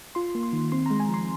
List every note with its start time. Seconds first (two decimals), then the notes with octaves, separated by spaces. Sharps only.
0.15 F4 C6
0.35 A#3
0.43 C6
0.53 D#3
0.72 C4 C6
0.86 G#3 A#5
1.00 G#5
1.09 F3 C6